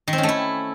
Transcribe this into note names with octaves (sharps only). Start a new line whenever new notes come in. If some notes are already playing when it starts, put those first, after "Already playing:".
D#3
C4
C#4
A3
E4